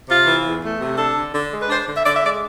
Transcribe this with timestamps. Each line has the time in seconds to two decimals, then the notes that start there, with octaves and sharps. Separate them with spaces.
0.08 C3 F4
0.26 E3
0.44 E2
0.62 A3
0.80 C3
0.98 D4 A4
1.16 D3
1.34 D3
1.52 G#3
1.61 B4
1.70 D4 C5
1.88 D3
1.96 E5
2.05 D3 D5
2.16 E5
2.23 G#3 D5